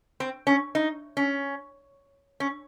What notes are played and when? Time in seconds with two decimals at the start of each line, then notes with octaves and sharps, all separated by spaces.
0.20 C4
0.47 C#4
0.75 D#4
1.17 C#4
2.40 C#4